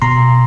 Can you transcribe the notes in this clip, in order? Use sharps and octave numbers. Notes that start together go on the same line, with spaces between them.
B2 A#5 C6